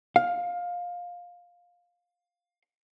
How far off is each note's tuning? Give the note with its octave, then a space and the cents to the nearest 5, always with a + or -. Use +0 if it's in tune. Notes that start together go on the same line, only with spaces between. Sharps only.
F5 +15